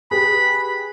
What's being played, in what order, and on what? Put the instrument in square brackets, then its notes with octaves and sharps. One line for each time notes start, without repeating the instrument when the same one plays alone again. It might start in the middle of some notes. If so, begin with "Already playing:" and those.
[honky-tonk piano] G4 G#4 B4 [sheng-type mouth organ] B5